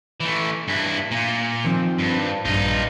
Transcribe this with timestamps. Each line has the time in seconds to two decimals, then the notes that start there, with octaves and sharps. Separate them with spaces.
0.20 E3 A3
0.68 G2 E4
1.11 A#2
1.65 D#3 F3 C4
1.99 G2
2.45 A#1 G2 D#4 F4